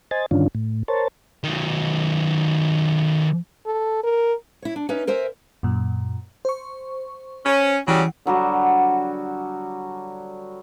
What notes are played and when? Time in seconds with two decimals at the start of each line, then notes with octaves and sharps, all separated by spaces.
0.11 C5 D#5 G#5 A6
0.31 G2 D3 D#3 C#4 D4 F4
0.55 A2
0.88 A#4 C5 C#5 A5
1.44 D#3 F#3
3.66 A4
4.04 A#4
4.62 E4 C#5
4.76 D4
4.89 C#4 D#4 B4 E5
5.07 A#4 C5 E5 G#5
5.63 F#2 A#2
6.45 C5 C#6
7.46 C#4
7.88 C#3 E3 F#3 G3 F#5 G5
8.26 D3 F#3 G3 F#4